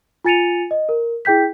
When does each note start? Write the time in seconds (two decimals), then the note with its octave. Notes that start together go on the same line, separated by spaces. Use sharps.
0.25 F4 G#5 A6 C#7 D#7 F7
0.71 D#5
0.89 A#4
1.25 E4 G#4 G5 G6 B6